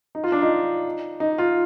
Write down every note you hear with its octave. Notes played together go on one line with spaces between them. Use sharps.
D#4
F4
D4
D#4
D#4
F4